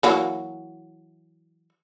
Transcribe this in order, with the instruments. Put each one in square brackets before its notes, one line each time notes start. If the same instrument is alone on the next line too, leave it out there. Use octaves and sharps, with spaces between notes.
[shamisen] E3 F#3 A#3